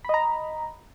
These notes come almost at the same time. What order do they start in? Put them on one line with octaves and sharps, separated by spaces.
B5 D#5 A#5